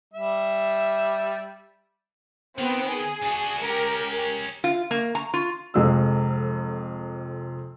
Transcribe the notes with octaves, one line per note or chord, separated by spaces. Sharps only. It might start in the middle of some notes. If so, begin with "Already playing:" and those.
G3 E5
D#3 B3 C4
G#4
D4 F#4
G#3 C#4 G4 A#4
F4
A#3
A#5
F4
F1 F2 G#3 E6